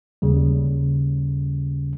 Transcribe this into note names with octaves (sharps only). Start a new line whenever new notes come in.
D#2 C#3 G3